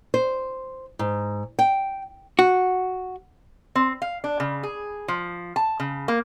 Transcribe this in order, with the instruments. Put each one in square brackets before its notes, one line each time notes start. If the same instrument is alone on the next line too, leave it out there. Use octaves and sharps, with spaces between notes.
[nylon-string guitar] C5
G#2
G5
[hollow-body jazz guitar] F#4
[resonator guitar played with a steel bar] C4
F5
D4
C#3
G#4
F3
A5
C#3
A#3